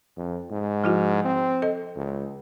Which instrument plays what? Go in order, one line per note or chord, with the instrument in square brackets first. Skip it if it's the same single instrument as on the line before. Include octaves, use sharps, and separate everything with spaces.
[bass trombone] F2
G#2
[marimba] F3 E4 F#4
[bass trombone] C4
[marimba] A4 D#5
[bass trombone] C#2